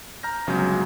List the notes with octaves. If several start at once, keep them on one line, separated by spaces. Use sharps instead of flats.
A#5 F6 G6 A#6
G1 C#3 F#3 G#3 G6